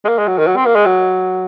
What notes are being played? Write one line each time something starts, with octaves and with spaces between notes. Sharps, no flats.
G#3
A#3
G#3
F#3
D#3
F#3
C4
A#3
G#3
F#3